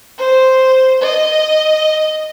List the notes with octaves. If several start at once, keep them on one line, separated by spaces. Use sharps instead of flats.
C5
D#5